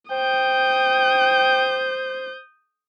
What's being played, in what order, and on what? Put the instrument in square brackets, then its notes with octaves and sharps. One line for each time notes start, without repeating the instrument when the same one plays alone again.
[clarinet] C5 [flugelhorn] G5 [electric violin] D#6 G6